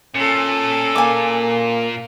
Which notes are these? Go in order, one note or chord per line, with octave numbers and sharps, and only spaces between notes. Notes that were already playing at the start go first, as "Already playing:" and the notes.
A#2 C#4 A4
A#3 G#5 D6